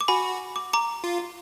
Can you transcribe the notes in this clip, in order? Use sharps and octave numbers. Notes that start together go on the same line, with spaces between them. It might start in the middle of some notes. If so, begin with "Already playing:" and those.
D6
F#4 G#5 B5
D6
A#5 D6
F4